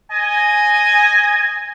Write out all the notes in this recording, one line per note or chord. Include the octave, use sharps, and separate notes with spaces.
D#5 G#5